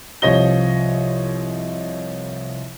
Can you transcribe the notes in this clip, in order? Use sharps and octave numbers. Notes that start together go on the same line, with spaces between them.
C2 F3 C#5 D#5 A#6 G7